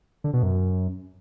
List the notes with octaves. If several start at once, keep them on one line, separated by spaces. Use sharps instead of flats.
D3
B2
F#2